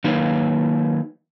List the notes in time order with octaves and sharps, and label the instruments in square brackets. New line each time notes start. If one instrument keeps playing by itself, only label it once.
[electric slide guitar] D#3 F#3 A#3 D#4 B4